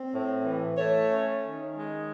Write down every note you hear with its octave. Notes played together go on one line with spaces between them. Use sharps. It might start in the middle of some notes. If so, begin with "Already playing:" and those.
Already playing: C4
A2
E3
A3 C#5
C#4
D#3
G#3